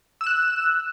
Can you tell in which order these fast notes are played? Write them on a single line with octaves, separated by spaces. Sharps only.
E6 E7 F#6